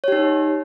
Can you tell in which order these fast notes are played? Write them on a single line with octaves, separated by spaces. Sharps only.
C#5 G4 D#4